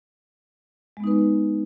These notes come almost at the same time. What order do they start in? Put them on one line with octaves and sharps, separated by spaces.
G#3 B3 D#4 B4